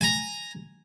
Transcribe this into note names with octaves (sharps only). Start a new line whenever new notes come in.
G#5 A#5